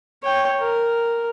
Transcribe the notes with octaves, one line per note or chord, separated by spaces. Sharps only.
C#5 G5
A#4